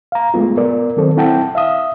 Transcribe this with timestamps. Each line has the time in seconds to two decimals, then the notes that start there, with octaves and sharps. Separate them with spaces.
0.12 F5 A#5
0.34 G#3 A3 B3 F4
0.57 B3 A#4 D5
0.97 D#3 F#3 C4 A4 C5
1.17 C4 E4 F#5 G5 A5
1.55 E5 F5 D#6